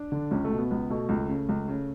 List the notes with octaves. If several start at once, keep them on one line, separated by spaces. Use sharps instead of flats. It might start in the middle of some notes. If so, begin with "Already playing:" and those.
Already playing: D4
D3
C#2 C#4
A3
B2
B3
C#2 B3
B2 A3
C#2
C#3
C#2
C#3